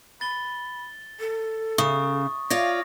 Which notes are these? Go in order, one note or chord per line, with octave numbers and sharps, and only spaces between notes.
B5 A6 G7
A4
C#3 C#6 D#6
F4 C#5 D5 F5 A#6